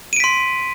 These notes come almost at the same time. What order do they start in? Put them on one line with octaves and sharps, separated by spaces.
D#7 D7 B6 C6